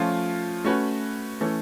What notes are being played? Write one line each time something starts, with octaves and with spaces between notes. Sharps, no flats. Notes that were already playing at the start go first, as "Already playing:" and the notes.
Already playing: F3 A3 C#4 F4
A3 C#4 F#4 B4
E3 A3 C#4